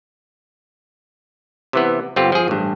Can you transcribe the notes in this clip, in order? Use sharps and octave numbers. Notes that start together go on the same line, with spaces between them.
C3 E3 B3
G1 C4 F4 G4
F3 G#4
A1 G2